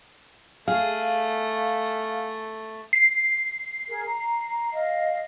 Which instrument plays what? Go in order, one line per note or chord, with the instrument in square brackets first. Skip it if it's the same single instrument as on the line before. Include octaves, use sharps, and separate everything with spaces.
[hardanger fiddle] A3 [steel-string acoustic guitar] G#4 [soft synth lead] F5
[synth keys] C7
[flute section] G#4 A#4
A#5
D#5 F5